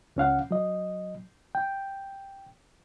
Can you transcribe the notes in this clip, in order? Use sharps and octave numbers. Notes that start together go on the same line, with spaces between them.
C#2 C#4 F5 F#5
F#3 D#5
G5